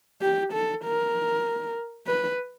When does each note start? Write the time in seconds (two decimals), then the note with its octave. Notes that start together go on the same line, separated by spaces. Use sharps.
0.22 G4
0.53 A4
0.84 A#4
2.07 B4